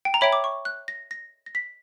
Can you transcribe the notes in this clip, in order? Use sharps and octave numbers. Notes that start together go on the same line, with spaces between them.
G5
A#5
C#5 E5 G5 B5
D6
C#6
F#6
A#6
A#6
A#6
B6